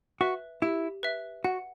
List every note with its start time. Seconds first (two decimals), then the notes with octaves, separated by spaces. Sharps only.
0.21 F#4 B4 E5
0.62 E4 G4
1.03 B4 E5
1.44 F#4 F#5